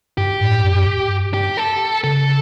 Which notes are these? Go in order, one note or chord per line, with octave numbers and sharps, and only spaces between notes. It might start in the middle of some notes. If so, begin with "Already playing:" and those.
G2 G4
A2
F#2
G2
G4
A4
C#3 A4